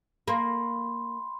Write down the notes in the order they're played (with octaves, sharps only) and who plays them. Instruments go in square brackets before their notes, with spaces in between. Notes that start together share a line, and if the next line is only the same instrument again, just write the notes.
[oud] A#3 [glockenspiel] B5 C6